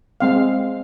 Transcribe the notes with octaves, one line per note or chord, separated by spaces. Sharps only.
G#3 C4 F5